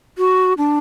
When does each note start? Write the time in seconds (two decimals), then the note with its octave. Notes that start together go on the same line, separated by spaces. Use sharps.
0.18 F#4
0.58 D4